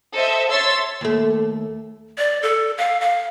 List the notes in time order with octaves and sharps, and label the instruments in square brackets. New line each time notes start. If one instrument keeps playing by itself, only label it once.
[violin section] A4 C5 D#5 E5
A4 C#5 E5 C6 E6 A6
[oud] D#2 A3
[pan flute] D5
A4
F5
F5